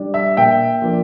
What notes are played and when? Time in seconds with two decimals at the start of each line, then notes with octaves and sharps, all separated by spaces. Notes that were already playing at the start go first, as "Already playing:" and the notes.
Already playing: G3 D4
0.14 E5
0.37 A#2 E5 G5
0.82 F3 A#3 D4